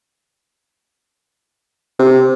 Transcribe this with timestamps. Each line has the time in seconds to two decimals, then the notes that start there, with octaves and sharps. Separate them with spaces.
1.99 C3